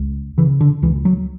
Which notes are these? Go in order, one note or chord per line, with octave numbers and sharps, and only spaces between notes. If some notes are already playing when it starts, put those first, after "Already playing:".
Already playing: C#2
C#3 E3
D3
C#2 E3
F#3